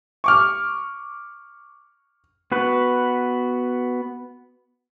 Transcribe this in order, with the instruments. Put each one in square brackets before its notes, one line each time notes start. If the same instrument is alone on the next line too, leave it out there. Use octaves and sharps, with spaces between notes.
[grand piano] C#6 D6 F6
[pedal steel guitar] B3 F#4 B4